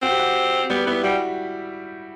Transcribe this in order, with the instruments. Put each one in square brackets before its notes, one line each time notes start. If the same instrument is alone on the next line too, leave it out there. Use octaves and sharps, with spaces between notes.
[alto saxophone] C4 [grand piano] F#4
[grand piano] G4
F#4
[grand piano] G3 G4 [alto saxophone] B3
[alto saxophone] B3 [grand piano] E4
[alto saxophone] G3 [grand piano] F#4